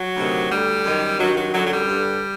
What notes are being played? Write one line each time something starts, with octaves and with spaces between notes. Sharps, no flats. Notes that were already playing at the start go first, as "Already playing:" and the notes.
Already playing: F#3
D2 C3 D#3
D2 D3 G3
F#2 D#3
G2 D#3 F#3
F#3
F#2 D3 F#3
F#3
G3
G2 D3